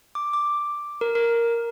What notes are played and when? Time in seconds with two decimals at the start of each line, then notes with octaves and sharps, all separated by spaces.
0.15 D6
0.33 D6
1.01 A#4
1.15 A#4